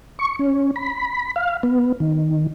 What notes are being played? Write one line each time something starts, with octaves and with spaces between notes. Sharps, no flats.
C#6
C#4
B5
F5
B3
D#3